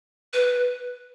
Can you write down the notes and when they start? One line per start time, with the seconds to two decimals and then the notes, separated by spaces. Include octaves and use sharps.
0.33 B4